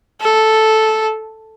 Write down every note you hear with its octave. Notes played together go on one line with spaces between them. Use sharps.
A4